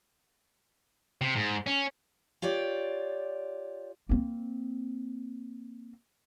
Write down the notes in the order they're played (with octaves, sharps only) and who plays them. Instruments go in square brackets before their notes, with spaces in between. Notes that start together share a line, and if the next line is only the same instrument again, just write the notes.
[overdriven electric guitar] C3
G#2
C#4
[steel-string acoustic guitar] F4 G4 C#5 D5
[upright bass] A#3 C4